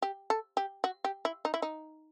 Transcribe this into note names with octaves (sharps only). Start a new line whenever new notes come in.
G4
A4
G4
F#4
G4
E4
D#4
E4
D#4